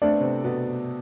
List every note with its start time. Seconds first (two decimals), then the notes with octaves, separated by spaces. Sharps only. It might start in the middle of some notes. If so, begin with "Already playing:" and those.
0.02 A3 C4 D4 A4 D5
0.11 B3
0.21 C3 C4
0.44 B2 B3